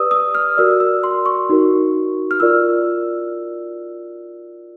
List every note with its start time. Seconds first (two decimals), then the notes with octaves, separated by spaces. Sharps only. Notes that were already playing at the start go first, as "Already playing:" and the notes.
Already playing: G4 B4 D5 D#6 E6
0.11 D#6
0.35 F6
0.58 F#4 A#4 D5 E6
0.80 E6
1.04 C6
1.26 C#6
1.49 D#4 F#4 A#4
2.31 F6
2.40 F4 A#4 D5 E6